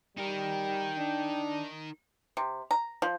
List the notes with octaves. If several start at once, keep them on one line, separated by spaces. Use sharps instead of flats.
G3 D#4 A#4 G5
D4
C3
A#5
F3